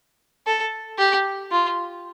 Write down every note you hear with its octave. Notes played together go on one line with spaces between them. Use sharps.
A4
G4
F4